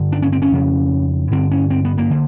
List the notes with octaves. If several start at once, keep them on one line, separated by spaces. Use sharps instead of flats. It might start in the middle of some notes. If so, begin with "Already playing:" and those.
Already playing: G2 D3
D4
C#4
C4
C#4
F2 C#3
G2 D3 C4
C#4
C4
B3
A#3
D3